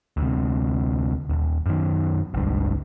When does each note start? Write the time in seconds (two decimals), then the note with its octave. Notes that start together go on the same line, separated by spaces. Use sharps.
0.17 D2 C3
1.29 D#1
1.66 F#2 D#3
2.34 G1 C#2 G2